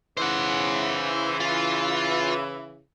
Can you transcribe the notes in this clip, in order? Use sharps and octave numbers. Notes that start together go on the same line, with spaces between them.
C#3 E3 C5 F#5
F4